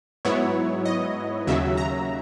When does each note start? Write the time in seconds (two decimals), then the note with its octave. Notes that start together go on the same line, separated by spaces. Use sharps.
0.25 G#2 F#3 B3 E4 C#5
0.85 D#5
1.47 D#2 C#3 F#3 E5
1.77 A#5